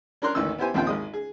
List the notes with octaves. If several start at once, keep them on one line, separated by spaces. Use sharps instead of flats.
C#4 D4 A#4 A#5 C6 F#6
G#1 D2 D#3 E3 E6
B3 E4 G4 C5 G#5
A#1 D#2 C4 F4 F5 G5
G#1 G#3 D#6
G#4